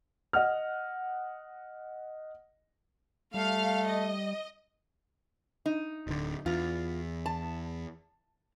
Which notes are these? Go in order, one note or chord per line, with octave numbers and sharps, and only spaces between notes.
D#5 F#5 F6
G3 A3 F5
D#5
D#4
D1 D3
E2 F4
A5